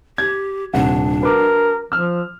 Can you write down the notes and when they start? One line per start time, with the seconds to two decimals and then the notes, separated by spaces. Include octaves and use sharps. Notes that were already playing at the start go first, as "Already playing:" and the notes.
0.18 G4 G#6
0.73 D#1 C3 D4 F#5
1.21 F#4 A#4 B4 D6
1.92 F3 E6 F6